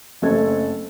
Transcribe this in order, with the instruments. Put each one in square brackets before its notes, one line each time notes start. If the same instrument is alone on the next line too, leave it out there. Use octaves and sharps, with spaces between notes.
[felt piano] F#1 A3 C4 A4 G#6